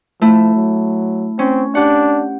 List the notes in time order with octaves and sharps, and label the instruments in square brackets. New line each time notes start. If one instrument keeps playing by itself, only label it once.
[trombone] F3 [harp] A3 E4
[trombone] F#3
[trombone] C4 [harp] C#4
[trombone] D4 [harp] G4 F#5